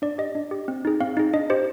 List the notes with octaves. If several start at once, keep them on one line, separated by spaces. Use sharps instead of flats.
D4 D5
G4 D#5
D4
G4
C4
D#4 G#4
C4 F5
D#4 G#4
D4 D#5
G4 C5